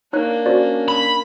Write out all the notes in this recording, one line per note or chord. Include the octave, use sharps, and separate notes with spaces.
A#3 D4 D#4 C#5 F#6
C#4 F#4 C5 D5
B5